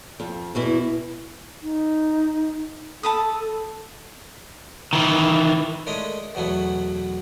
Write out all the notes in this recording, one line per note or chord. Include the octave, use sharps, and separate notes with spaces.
F2
E2 B2 E3
D#4
A4 A5 B5 D#6
D#3 E3
G#3 A3 C#4 D4 A#4 D#5
E2 B2 F#3 A3 B3